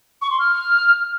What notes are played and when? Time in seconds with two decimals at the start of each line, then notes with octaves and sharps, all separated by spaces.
0.22 C#6
0.31 C6
0.39 F6